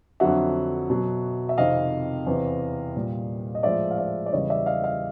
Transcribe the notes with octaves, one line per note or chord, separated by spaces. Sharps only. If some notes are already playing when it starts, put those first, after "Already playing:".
F2 D3 F#3 E5 F#5
B2 F#3
E5
F2 C3 D#3 D#5 F5
E2 C3 E3
A#2 G3
D#5
A2 F3 G#3 D5 E5
F5
D5 E5
D5
E2 C#3 E3 G3 C#5 D#5
D5 E5
D#5 F5
D#5 F5